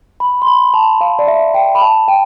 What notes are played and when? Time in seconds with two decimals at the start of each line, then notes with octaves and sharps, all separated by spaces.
0.20 B5
0.42 C6
0.47 B5
0.74 A5
1.01 F5
1.19 D5
1.28 E5
1.54 G5
1.75 B5
1.82 A5
2.08 G5